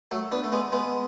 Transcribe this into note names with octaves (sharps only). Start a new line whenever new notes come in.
F#3 A3
B3 D4
A3
G#3 B3
G#3 B3